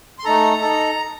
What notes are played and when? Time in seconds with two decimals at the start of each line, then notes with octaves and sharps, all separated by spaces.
0.19 C6
0.25 A3 D#4 A4 A#5
0.62 D#4 A4